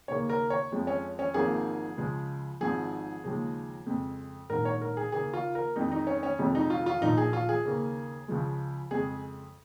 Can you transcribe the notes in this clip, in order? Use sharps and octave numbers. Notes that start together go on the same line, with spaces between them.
D#2 C#3 A#3 C#5
A#4
C#5
F2 F3 G#3
C#4
C#4
G#1 G#2 F3 A#3 G#4
C#2 C#3 F3 G#3
G#1 G#2 F3 G#4
D#2 C#3 F3 G#3
F2 C#3 G#3
A#1 G#2 D#3 A#4
C#5
A#4
G#4
D#2 C#3 A#3 G#4
F4
A#4
F2 D#3 G#3 D#4
D#4
C#4
C#4
F1 F2 F3 G#3
D#4
F4
F4
A#1 A#2 F3 D#4
G#4
F4
G#4
D#2 C#3 A#3
C#2 C#3 F3 G#3
F2 C#3 G#3 G#4